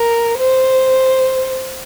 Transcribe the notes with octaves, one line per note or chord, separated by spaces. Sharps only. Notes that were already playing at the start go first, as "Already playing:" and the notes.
Already playing: A#4
C5